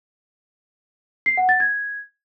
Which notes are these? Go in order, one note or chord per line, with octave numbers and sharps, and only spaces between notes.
C7
F#5
A6
G#6